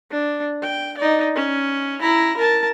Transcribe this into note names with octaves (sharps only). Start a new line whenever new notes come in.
D4
G5
D#4 D5
C#4
E4 A#5
A#4 A5